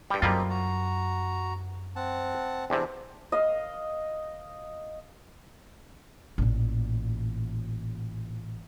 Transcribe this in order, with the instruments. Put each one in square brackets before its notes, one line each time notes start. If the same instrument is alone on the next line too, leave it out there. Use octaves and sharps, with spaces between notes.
[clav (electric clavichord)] G2 G3 [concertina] G5
[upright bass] F#2 [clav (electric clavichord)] G3 A#3 F4 [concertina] C4 D#4 A4
[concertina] F#4 A#5
C4 F#5 A5
[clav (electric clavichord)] E2 C3 [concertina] C4 D4
[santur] D#5 F5
[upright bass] A1 A#2